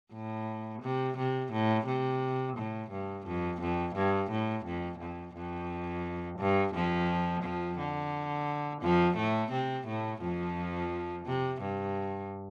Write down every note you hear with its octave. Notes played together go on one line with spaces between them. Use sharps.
A2
C3
C3
A2
C3
A2
G2
F2
F2
G2
A2
F2
F2
F2
G2
F2 F3
F2 F3
D3
F2 F3
A2 A3
C3 C4
A2 A3
F2 F3
C3
G2